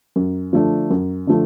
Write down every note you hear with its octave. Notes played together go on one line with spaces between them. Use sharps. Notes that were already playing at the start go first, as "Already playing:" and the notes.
F#2
D3 F3 A3 D4
F#2
D3 F3 A3